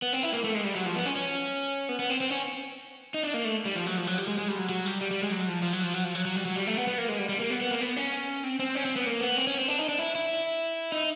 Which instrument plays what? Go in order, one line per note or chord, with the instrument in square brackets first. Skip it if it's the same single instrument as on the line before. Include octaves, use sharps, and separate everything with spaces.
[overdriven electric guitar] B3
C4
E4
A#3
A3
G#3
G3
F#3
F3
B3
C#4
C#4
B3
B3
C4
C4
C#4
D#4
D4
A#3
A3
G3
F3
F#3
F3
F#3
G3
G#3
G#3
G3
F#3
F#3
G3
G3
G3
G#3
F#3
F3
F3
F#3
F3
F#3
F3
F#3
F#3
G3
F#3
G3
A3
B3
B3
A#3
G#3
G3
G3
A#3
B3
B3
A#3
B3
C#4
C4
C4
C#4
C4
B3
A#3
B3
C4
C#4
C4
D4
D#4
D4
E4
E4
D#4